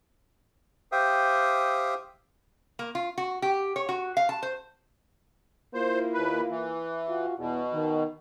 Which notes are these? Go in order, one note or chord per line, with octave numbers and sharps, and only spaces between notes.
G4 C5 E5 F5 G5 D#6
A#3
F4
F#4
G4
C#5
F#4
F5
A5
C5
A#3 E4 F4 C5
D#2 B4
E3
F4 F#4
E2 B2
D#3